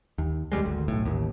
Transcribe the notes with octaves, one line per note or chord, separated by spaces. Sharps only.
D#2
D#2 B2 G3 G#3
G#1 D2
B1 A2
A1 D#2